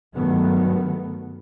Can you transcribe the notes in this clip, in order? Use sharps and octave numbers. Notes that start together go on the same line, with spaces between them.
G2 D#3 F#3 A3 B3